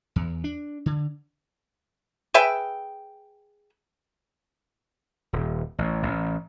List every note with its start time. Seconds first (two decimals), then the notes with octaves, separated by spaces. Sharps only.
0.16 E2
0.44 D4
0.86 D3
2.34 G#4 B4 E5 G5
5.33 D#1
5.78 A1
6.03 A1